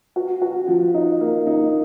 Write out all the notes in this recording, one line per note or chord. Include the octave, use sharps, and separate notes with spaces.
F#4
F#4
F3
D#4
A#3
D#4